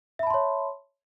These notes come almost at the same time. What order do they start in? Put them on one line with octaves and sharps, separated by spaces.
E5 B5 A5 C6 C#5